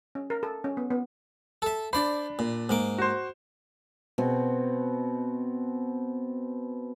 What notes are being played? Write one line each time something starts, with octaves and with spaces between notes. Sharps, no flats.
C#4
A#4
A4
C#4
B3
B3
A4 E5
D4 C5 D5 B5
A#2
G#2 A#3 D6
F#4 C5
B2 B3 C4